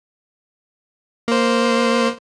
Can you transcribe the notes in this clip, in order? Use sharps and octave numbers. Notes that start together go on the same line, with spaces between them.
A#3 C5